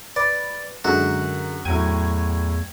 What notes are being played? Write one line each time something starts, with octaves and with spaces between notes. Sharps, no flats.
B4 D5
F#2 D3 G#3 F#4 A#4
E2 A2 F#3 G5 G#6 D#7